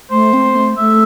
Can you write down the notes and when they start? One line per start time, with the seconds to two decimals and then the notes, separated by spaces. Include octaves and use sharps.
0.11 A3 C5
0.33 C4
0.55 A3
0.78 A3 E5